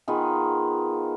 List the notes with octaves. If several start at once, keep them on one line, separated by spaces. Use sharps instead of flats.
D#3 B3 F4 G#4